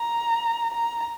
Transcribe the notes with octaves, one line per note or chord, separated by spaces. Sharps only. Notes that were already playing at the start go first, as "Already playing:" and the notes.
Already playing: A#5
A#5